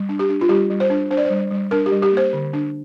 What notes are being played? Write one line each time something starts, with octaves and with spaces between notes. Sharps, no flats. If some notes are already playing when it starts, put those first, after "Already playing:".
Already playing: G3
D4
G4
D4
F4
G3 G4
G3
C5
D4
D4 C5
D5
C5
G3
G3
D4 A#4
G4
G3
G4
A#3
C5
D3
D4